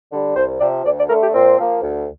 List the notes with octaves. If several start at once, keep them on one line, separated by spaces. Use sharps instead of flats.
D3 G3
C2 C5
C3 F3 D5
D2 D5
D5
D3 A3 A#4
G4
A#2 C4
F3 A#3
D2